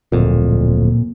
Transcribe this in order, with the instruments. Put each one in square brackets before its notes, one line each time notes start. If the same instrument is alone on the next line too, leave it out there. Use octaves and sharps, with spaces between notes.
[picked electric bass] D1 F2 [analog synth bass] A#2